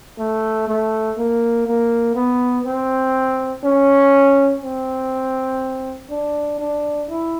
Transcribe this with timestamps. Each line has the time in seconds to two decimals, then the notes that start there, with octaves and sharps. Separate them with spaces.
0.18 A3
0.68 A3
1.18 A#3
1.67 A#3
2.15 B3
2.65 C4
3.64 C#4
4.63 C4
6.11 D4
6.60 D4
7.09 E4